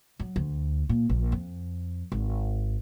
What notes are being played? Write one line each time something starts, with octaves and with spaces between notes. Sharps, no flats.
F#3
D2
A#2
A#1
F2
G#1